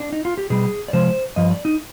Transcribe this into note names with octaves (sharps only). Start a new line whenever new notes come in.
D4
D#4
F4
G4
B2 G3 G#4
D5
C3 F3 G#3 C5
G2 F3 D#5
D5
D#4